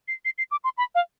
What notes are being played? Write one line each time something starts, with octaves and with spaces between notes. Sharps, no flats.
C7
C7
C7
D6
C6
B5
F5